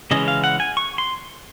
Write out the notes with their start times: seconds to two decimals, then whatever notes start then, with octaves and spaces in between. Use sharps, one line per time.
0.11 C#3 E3 G#3 C#4 D#5
0.28 F5
0.44 F#5
0.60 G#5
0.77 C#6
0.98 C6